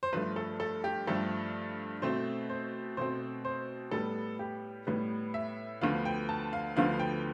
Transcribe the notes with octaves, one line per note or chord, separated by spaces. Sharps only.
C5
G2 F3 A3 B4
A4
A4
G4
G2 F3 A3 A4
B2 A3 C4 C5
C5
B2 A3 C4 C5
C5
A2 G3 B3 A4
G4
A2 G3 B3 B4
E5
D2 D3 F3 B3 F5
G5
A5
F5
D2 D3 F3 B3 F5
G5